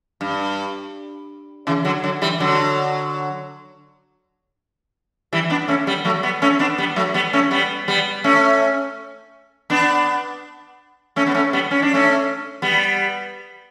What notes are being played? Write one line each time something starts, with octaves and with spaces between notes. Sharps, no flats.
G2
C#3 E3
D3 F#3
D3 F#3
E3 G3
D3 F#3
E3 G3
B3 D4
A3 C#4
G3 B3
F#3 A3
G3 B3
A3 C#4
B3 D4
G3 B3
F#3 A3
G3 B3
A3 C#4
G3 B3
G3 B3
A3 C#4
B3 D4
A3 C#4
B3
A3 C#4
G3 B3
C#4
D4
A3 C#4
G3 B3